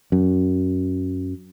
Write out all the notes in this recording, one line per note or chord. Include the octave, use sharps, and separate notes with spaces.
F#2